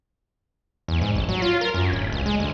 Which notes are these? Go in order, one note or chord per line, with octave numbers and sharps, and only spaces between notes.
E2
G#2
A1
F#3
F4
A#4
F#2
D1
C#2
G#3
D2